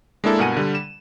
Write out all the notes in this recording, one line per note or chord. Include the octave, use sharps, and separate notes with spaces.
G#3 A#3 D4 E4 A4
G2 B2 A#4 F#5 G#5 D#7
D3 G3
E7